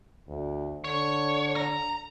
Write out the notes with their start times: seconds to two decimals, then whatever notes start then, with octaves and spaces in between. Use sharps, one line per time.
0.28 D2
0.84 D3 C#5
1.56 A#5